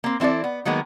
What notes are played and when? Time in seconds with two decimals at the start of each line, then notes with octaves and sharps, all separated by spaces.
0.04 A#3 C4
0.20 E3 C4 E4 A4 D5
0.44 B3
0.65 D#3 F#3 G#3 A#3 B3